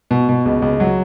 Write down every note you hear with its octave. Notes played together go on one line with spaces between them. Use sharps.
B2
B2
C#2
C#2
F#3